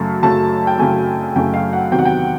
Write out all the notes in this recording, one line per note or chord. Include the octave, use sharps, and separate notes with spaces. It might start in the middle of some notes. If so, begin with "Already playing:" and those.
Already playing: F#2 C#3 F#3 A3 A5
F#2 C#3 F#3 A3 A5
G5
F#2 C#3 F#3 A3 G#5
F#2 C#3 F#3 A3 G5
F5
F#5
E2 C3 D#3 F#3 G5
F#5
G5